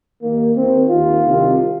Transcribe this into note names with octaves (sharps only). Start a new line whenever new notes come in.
D#2 D#3 A#3
D#2 D#3 C4
D#2 D#3 F4
C2 C3 D#3